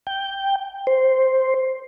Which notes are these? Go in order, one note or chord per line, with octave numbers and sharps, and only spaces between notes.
G5
C5